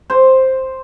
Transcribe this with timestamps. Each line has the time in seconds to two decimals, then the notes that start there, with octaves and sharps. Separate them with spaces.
0.10 C5